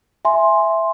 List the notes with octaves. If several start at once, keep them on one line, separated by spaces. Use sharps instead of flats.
E5 G#5 C6